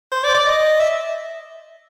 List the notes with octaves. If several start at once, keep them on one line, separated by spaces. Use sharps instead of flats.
C5
D5
D5
D#5
E5